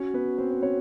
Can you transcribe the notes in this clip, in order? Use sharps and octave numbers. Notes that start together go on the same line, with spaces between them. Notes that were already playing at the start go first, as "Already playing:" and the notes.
Already playing: C#4 F#4 C#5
B3 B4
C4 C5
C5
C#4 C#5